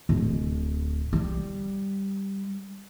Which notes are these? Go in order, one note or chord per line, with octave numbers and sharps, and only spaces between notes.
D1
G3